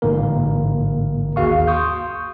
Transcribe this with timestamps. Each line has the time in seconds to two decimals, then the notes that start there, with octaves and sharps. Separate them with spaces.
0.02 A1 G#2 D3 A#3 A#4
1.36 D#2 F#4 G#4 F5 C#6
1.67 C6 C#6 D#6 G6